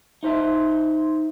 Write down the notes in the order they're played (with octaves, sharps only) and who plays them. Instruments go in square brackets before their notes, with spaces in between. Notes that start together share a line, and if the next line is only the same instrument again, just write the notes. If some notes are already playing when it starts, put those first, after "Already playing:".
[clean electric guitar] D#4 C5 E5